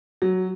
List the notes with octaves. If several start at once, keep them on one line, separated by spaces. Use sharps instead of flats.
F#3